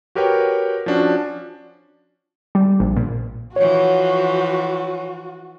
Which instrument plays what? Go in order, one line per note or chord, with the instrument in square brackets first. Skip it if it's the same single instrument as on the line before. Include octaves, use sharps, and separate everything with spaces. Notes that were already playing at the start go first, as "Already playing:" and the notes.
[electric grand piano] F#4 G4 A#4 B4 C#5 G5
F3 C#4 D4 F#4
[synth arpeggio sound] G3
A#1
A#2
[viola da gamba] E3 F3 [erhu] F#4 [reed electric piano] C#5